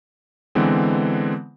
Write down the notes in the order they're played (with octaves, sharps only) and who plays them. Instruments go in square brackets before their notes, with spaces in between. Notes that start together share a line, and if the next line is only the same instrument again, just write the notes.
[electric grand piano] D3 E3 G#3 B3 C4